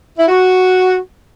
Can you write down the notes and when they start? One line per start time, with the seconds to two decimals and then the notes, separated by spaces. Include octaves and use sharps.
0.18 E4
0.28 F#4